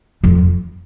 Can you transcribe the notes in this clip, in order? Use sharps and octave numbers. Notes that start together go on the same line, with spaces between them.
F2